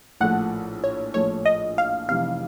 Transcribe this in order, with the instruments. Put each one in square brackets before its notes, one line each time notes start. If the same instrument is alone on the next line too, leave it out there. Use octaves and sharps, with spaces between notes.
[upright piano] A#1 A2 F3 A3 [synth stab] F#5
[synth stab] C#5
[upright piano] A#1 A2 F3 A3 [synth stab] C#5
[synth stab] D#5
F5
[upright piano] F1 F2 C3 E3 [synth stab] F5